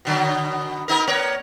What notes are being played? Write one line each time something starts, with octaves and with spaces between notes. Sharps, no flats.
B2 D3 F#3
B3 D#4 A#4
A#3 A#4 C#5